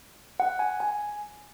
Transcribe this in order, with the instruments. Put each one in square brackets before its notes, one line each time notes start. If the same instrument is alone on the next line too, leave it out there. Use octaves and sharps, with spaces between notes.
[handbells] F#5
G#5
G#5